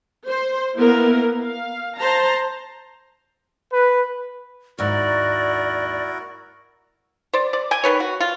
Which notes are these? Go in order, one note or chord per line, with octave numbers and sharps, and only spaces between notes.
C5
A#3 B3 E4 A#4
F5
C5 A5 A#5
B4
D#2 G#2 E4 F#4 A#4 D5
C5 D5
D5
G5 G#5
D#3 B4 C#5
F#4
F4